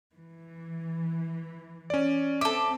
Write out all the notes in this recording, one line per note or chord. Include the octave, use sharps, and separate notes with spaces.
E3
C#4 D5
C4 A4 E5 D6